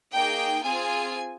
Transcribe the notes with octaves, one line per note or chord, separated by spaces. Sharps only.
A#3 D#4 G#4 G5
C4 F4 G#4 G#5